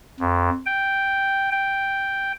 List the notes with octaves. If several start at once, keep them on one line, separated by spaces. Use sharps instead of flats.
F2
G5
G5